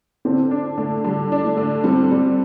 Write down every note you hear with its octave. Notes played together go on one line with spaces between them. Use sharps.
D3 C4
D4
D3 A3
D3 G3
D4
A3
D3
G3 C4
G3